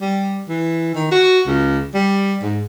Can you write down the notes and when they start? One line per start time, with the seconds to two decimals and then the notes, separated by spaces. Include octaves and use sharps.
0.02 G3
0.48 E3
0.95 D#3
1.11 F#4
1.47 C#2
1.95 G3
2.42 G#2